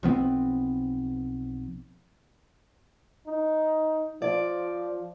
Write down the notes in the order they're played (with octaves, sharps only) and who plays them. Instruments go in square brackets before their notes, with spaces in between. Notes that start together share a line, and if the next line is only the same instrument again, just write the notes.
[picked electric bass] B1 F3 B3 C4
[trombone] D#4
[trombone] F3 [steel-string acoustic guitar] D5